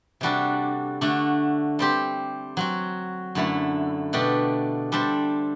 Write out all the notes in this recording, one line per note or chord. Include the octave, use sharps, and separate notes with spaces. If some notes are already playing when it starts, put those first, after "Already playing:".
C3 G3 D4 F#4 A4
D3 A3 D4 F#4
G3 C4 G4 C5
F#3 C4 F#4
F#2 D3 A3 E4
B2 A3 D4 G4 D5
G3 D4 A4 C5